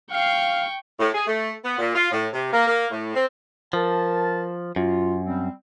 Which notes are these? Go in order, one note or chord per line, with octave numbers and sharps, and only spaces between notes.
F5 G5 C#6
A2
G#4
A3
B3
A#2
F4
A2
C3
A#3
A#3
A2
C4
F3 A#4 A5
F#2 F4
G3 C4